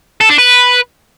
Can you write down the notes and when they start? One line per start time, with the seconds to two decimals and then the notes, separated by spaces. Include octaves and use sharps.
0.21 A4
0.30 D4
0.38 B4